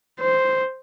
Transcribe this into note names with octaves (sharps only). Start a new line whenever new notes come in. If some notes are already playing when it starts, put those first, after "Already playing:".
C5